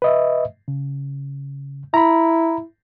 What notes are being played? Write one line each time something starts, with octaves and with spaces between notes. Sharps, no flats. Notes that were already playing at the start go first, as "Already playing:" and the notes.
B4 D#5 E5
C#3
E4 A#5 B5